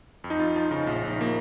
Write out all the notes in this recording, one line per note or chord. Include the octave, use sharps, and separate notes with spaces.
F2
D#4
F2 F4
F3 D#4
C#3 D#4
A#1 F4
A#1 D#4
F3 A#3